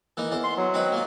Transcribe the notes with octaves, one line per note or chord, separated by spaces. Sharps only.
E3 A#3 D#4
E2 C5
C6
F#3
C4 D#4 B4
A#3 F4